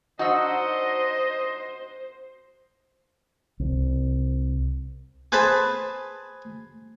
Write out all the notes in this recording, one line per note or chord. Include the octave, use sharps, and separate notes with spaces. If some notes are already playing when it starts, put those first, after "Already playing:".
D4 D#4 F#4 C5 D#5 E6
C2
G#4 B4 C5 A5 B5